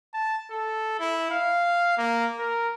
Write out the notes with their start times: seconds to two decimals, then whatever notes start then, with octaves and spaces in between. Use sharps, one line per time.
0.14 A5
0.50 A4
1.00 E4
1.31 F5
1.98 A#3
2.39 A#4